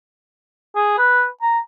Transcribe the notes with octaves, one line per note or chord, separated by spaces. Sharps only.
G#4
B4
A#5